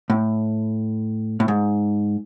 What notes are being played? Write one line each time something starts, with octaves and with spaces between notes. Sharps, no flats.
A2
A2
G#2